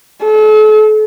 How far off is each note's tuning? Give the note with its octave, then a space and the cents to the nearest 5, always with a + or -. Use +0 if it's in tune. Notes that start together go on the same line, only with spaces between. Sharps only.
A4 -40